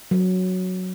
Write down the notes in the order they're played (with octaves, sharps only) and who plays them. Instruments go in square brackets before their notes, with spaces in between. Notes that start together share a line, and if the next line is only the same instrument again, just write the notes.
[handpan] F#3